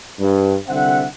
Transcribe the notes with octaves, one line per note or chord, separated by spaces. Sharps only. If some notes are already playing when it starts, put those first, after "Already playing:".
G2
C2 D3 C4 E5 F#5